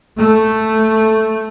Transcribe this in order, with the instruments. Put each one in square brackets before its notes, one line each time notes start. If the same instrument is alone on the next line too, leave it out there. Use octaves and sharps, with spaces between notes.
[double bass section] A3